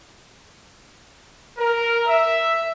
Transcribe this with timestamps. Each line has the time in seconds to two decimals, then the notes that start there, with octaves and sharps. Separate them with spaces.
1.58 A#4
2.07 E5